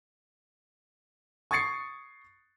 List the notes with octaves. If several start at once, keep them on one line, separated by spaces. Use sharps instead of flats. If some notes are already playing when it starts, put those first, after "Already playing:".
C#6 D#6 G#6 A6 C7 C#7